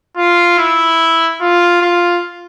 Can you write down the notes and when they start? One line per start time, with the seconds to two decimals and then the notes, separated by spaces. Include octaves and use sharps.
0.17 F4
0.58 E4
1.41 F4
1.82 F4